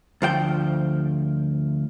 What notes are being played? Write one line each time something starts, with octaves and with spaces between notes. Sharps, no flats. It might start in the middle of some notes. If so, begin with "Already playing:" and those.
D2 F3 G5